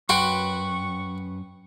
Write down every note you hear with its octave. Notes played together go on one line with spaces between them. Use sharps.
F#2 F#4 B4 G5 C6 C#6